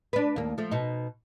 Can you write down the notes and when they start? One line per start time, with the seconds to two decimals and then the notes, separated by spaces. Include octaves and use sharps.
0.13 D4 B4
0.36 D#2 A#3
0.58 F3 A3
0.71 B2 D#4